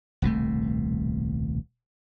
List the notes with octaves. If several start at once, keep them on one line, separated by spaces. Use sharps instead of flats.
D#1 C2 B2 A3